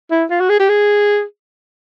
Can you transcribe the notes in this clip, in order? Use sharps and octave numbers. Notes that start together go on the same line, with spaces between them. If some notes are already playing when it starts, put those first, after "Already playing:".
E4
F4
F#4
G#4
G4
G#4